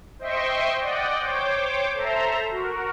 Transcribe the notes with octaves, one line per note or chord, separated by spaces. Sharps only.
C5 D#5 E5 G5 C6 C#6
D5 D#5 F#5 G5
C5 C#5 G5 D6
A4 C5 E5 A#5
F#4 A#4